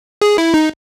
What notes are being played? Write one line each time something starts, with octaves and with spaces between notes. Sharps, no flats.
G#4
E4
D#4